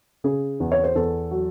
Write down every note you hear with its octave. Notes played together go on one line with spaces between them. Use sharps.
C#3 G#4
E2
C#5
C5
E2 A4
F#3